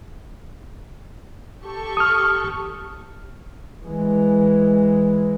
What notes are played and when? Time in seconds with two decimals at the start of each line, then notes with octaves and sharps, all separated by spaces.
1.63 G4 A4 C#6
1.97 D#6 F6
3.86 E3 G#3